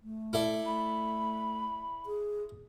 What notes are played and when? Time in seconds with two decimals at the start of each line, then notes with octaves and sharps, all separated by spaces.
0.03 A3
0.33 E4 A4 D5
0.66 A3 B5
2.06 G#4